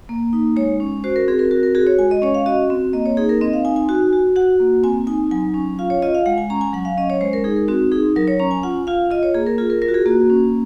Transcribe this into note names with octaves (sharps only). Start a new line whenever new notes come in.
A#3
D#4
G#3 C#5
C#4
F#4 C5
A#4
C4 G#4
A#4
F#4 A#4
A#4
F#4 G#4
C#5
G#3 G#5
D#5
C#4 C#5
F5
F#4 D#5
C4
A#3 D#5
C#5
D#4 G#4
A#4
C4 D#5
F5
D#4 G#5
G#5
F#4 G#5
F#4
F#4 F#5
A#3
C4 G#5
D#4 G#5
F#3 G#5
C#4
F4 F5
C#5
F4 D#5
F5
G#3 F#5
G#5
C#4 A#5
G#5
F#3 F#5
F5
C#4 D#5
C#5
G#3 C5
A#4
D#4 G#4
A#4
C4 F#4
D#4 G#4
F#3 A#4
C#5
C#4 A#5
G#5
F4 F#5
F4 F5
F4 D#5
C#5
A#3 G#4
A#4
F4 G#4
A#4
F4 A#4
F#4
G#4
A#3 F#4
C#4